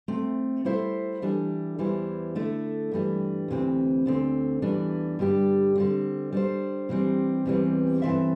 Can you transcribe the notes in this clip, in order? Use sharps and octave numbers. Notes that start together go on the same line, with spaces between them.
C3 A3 C4
G3 E4 A4 C5 E5
E3 G3 D4 A4
E2 E3 G3 E4 C5
D3 A3 E4
G2 E3 G3 D4
D2 C3 E3 C4
D2 D3 C4
E2 E3 G3 D4
G2 D3 G3 D4 G4
D3 G3 C4
G3 D4 C5
C3 E3 G3 C4
E2 C3 E3 G3 C4
G2 E3 C4 A4 E5